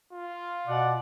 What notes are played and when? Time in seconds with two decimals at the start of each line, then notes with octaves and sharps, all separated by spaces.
0.13 F4
0.67 B2 D5 F#5